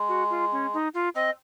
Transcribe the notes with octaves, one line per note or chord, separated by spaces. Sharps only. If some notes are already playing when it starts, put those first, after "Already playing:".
Already playing: G#3
F#4
F4
C#4
D#4
F4
C4 D#5